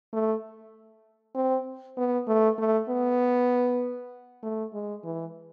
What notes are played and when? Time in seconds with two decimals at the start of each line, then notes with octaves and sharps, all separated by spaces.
0.13 A3
1.35 C4
1.97 B3
2.28 A3
2.59 A3
2.89 B3
4.43 A3
4.73 G#3
5.04 E3